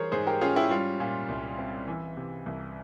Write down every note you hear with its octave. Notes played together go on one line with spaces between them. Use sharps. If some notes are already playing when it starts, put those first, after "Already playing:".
Already playing: E3 G3 G#4 A#4 C5 C#5
G#2 G#4 C5
G4 A#4
C#4 F4 G#4
E4 G4
G3 F4
A#2
C2
C4
E3
C3
C2